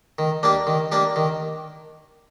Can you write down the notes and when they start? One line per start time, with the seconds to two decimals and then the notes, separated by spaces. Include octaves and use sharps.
0.19 D#3
0.43 A#3 D4 G4
0.67 D#3
0.92 A#3 D4 G4
1.16 D#3